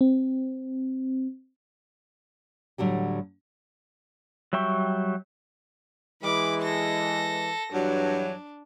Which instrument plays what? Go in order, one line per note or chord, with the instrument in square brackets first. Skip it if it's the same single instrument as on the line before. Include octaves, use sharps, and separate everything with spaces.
[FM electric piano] C4
[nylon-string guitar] A2 D3 F#3 G3
[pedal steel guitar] F#3 G3 E5 G5 C#6
[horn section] E3 G#3 [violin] B5 D6
[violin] A4 A#6
[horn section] G2 E3 F#3 [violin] D4